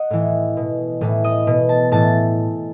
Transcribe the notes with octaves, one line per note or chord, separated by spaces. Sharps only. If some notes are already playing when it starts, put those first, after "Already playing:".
Already playing: D#5 F#5
A2 E3
B2
A2 E3
D#5
B2
A5
A2 E3 A5